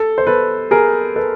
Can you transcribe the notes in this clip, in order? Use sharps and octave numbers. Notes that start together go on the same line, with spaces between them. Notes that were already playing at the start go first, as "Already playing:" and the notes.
Already playing: A4
C5
A4 B4
G#4 A#4
A4 B4